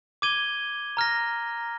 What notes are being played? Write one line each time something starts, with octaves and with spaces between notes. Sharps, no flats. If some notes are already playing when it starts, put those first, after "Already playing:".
D6 G#6 D#7 G7
A#5 F6 A#6